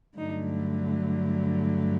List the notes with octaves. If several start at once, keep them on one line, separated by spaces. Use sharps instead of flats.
G2 D3 F#3 A3 D#4